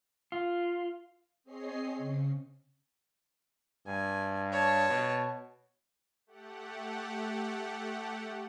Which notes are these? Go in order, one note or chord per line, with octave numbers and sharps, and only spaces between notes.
F4
C4 G#4 C#5 D#5 C7
C#3
G2 G#5
C#5 A5
B2
A3 G4 F#5